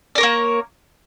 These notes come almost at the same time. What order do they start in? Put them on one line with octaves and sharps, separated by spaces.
D5 A#4 C#5 A#3